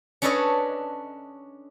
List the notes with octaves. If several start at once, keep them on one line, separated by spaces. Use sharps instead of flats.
C#4 D4 A4 B4 C#5 D#5